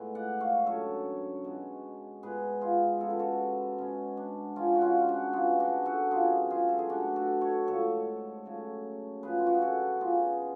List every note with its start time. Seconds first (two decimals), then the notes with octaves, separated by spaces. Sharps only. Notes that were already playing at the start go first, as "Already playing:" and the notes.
Already playing: A2 G#3 B3 B4
0.15 D5 F#5
0.40 C#5 F5
0.66 F#2 D3 F#3 A4 C#5
1.44 B2 G#3 B3
2.23 G#2 G#3 B3 G#4 B4
2.61 F4 G#4
3.00 C#3 F3 G#3 B3 A4
3.10 B4
3.19 F#4 A4
3.78 G#2 G#3 B3 C#4
4.17 D4
4.56 C#3 F3 G#3 C#4 F4
4.75 F#4
4.81 C#4 F4
5.08 D4 F#4
5.33 C#3 F3 B3 F4 G#4
5.60 D4 F#4
5.85 F#4 A4
6.11 F#2 C#3 G#3 B3 F4 G#4
6.50 F4 G#4
6.69 A4
6.79 G#4
6.89 B2 A3 D4 F#4
7.16 F#4 A4
7.41 A4 C#5
7.67 G#2 F3 A3 A4 C#5
8.45 C#3 F#3 A3
9.23 F#2 C#3 F3 B3 G#4 B4
9.39 F4
9.46 F#4
9.55 G#4
9.62 F#4 A4
10.00 C#3 F#3 B3 F4 G#4